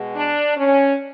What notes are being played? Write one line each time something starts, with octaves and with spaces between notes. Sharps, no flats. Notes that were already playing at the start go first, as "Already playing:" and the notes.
Already playing: B2 G#3
D4
C#4